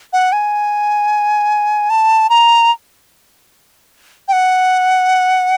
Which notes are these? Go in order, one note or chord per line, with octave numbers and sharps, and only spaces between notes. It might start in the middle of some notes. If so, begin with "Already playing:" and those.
F#5
G#5
A5
A#5
G5
F#5